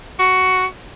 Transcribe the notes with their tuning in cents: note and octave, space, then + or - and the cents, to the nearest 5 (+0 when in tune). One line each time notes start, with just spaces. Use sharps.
F#4 +5